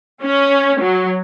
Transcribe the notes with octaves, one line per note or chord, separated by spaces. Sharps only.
C#4
F#3